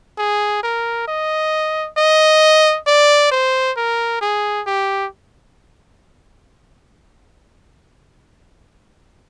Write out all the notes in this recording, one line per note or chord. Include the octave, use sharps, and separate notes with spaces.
G#4
A#4
D#5
D#5
D5
C5
A#4
G#4
G4